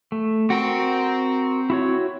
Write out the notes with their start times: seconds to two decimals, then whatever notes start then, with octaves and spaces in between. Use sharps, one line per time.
0.12 A3
0.50 C4 F#4 A#4 G5 C#6
1.70 E4 F#4 C#5